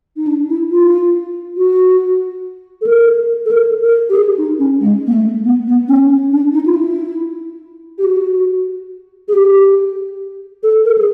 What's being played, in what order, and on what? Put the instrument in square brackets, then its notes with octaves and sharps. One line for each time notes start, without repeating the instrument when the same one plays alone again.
[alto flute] D#4
D4
E4
F4
F#4
A4
A#4
A4
A#4
A#4
G4
G#4
D#4
C#4
G#3
A#3
A3
B3
B3
C#4
C#4
D4
D#4
F4
E4
G4
F#4
G#4
G4
A4
A#4
G#4